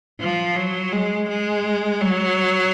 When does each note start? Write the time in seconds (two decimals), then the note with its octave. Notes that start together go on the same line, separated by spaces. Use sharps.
0.20 F3
0.56 F#3
0.93 G#3
1.29 G#3
2.01 F#3